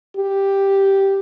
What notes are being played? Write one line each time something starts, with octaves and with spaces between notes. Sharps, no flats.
G4